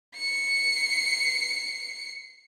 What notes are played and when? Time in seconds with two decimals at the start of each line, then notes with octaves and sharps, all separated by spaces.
0.17 C7 C#7